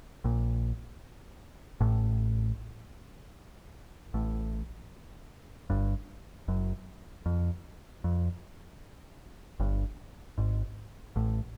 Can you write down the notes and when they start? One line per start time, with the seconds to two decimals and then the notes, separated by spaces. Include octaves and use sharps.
0.24 A#1 A#2
1.81 A1 A2
4.14 A1 A2
5.70 G1 G2
6.48 F#1 F#2
7.26 F2
8.04 F2
9.60 G1 G2
10.38 G#1 G#2
11.16 A1 A2